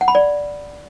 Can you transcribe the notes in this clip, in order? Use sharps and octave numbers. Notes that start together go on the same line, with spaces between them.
F#5
B5
D5